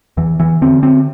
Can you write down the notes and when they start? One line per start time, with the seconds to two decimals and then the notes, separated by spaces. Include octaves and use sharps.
0.17 E2 E3
0.40 E3
0.62 D3 C4
0.83 C4